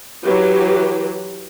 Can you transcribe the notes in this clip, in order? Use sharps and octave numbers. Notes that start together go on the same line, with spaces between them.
E3 F#3 G4 B4